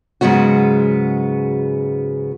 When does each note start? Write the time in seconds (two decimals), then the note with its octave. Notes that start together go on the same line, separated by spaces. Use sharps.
0.21 G#2 C#3 F#3 G#3 B3 F#4